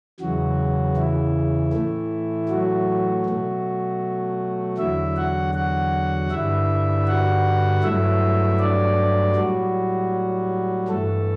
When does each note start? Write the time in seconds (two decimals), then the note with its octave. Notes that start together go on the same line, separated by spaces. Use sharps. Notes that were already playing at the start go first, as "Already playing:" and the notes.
0.20 E2 C#3 E3 F#3 F#4
0.96 E3 E4
1.74 A2 E3 A3
2.49 F#3 F#4
3.26 B2 A3
4.78 E2 D3 F#3 E4 E5
5.17 F#4 F#5
5.54 F#4 F#5
6.31 G2 D3 G3 E4 E5
7.07 F#4 F#5
7.83 G2 F#3 A3 E4 E5
8.59 D4 D5
9.36 A2 F#3 G3 F#4
10.88 G2 E3 A3 A4